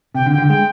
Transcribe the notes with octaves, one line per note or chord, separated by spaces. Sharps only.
C3 G5
D3
G5
D3
G#3 G5